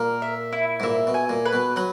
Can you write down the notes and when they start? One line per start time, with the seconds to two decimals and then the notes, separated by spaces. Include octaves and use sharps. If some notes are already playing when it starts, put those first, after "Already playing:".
Already playing: A#2 A#4
0.22 E5
0.53 E4
0.80 G#2
0.83 A#2 E5
1.07 B2
1.14 G#5
1.29 A#2
1.45 B4
1.53 B2
1.76 F#3 B4